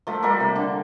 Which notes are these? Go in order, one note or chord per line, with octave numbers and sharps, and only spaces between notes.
F3 A3
G3 A#3
C3
D3